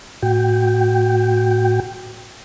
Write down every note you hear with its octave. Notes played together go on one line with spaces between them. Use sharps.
A2 F#4 G5